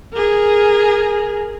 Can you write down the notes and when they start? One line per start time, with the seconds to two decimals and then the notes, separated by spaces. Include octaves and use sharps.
0.13 G#4 A#4